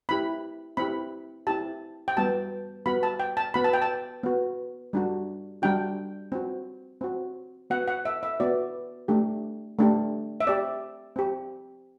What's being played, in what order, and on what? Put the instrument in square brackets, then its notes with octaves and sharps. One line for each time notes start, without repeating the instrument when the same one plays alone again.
[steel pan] C4 E4 G4 B5
C4 E4 G4 B5
C4 E4 G4 A5
G5
G3 B3 F#4 A5
G3 B3 F#4 B5
A5
G5
A5
B3 F#4 B5
A5
G5
A5
B3 F#4
G3 D4 F#4
G3 D4 F#4 G5
C4 F#4
C4 F#4
B3 F#4 F#5
F#5
E5
E5
B3 F#4 D5
A3 D4 G4
A3 D4 G4
E5
C4 G4 D5
C4 G4